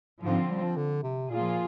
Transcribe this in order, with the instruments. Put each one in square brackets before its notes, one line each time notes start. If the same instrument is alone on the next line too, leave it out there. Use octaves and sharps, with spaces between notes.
[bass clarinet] G#2 [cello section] D3 F3 C4 F4
[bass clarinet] G3
F3
D3
C3
[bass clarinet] A#2 [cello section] F3 A#3 F4 G#4